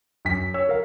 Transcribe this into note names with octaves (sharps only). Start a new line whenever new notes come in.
F#2 B6
C#5 E6
A4 A#4 F5